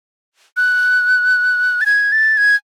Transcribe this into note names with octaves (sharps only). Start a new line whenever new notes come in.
F#6
A6
G#6
A6
G#6